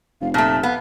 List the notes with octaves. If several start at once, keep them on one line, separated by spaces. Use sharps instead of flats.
F1 F5
A#2 A3 A5
B3 F5